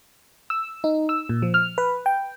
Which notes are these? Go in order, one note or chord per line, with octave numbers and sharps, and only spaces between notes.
E6
D#4
E6
A#2
F3
F6
B4
G5